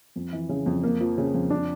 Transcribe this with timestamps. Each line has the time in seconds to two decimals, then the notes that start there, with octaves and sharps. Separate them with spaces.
0.16 F2
0.33 E3
0.49 C#3
0.66 F2
0.83 A#3
1.01 F3
1.18 C#3
1.34 F2
1.50 D4